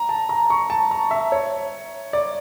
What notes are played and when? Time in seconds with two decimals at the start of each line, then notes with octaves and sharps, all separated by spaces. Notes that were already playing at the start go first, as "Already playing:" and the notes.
Already playing: A#5
0.09 A5
0.29 A#5
0.50 C#6
0.70 A5
0.91 A#5
1.11 E5
1.32 C#5
2.13 D5